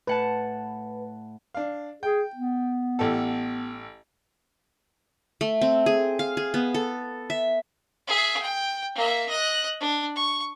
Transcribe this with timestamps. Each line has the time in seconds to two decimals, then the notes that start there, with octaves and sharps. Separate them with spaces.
0.07 A2 B4 F#5 A5
1.54 D4 F5
2.03 G#4 G5
2.36 B3
2.99 A1 G4 A4
5.41 A3
5.62 C4
5.86 G#4
6.19 F5
6.37 G#4
6.54 B3
6.74 A4
7.30 E5
8.07 G#4 E5
8.42 G5
8.95 A#3 E5
9.28 D#5 F#6
9.80 D4
10.16 C#6